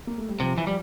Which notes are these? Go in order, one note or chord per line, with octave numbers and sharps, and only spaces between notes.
A#3
A3
G3
C3 F3
E3
G3